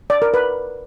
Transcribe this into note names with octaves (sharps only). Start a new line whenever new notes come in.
D5
A#4
B4